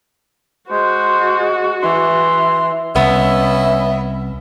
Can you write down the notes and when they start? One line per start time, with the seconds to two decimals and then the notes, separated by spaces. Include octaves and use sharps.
0.70 G#3 F#4 C5
1.83 E3 C6
2.96 C2 B3 C#4 D#5 E5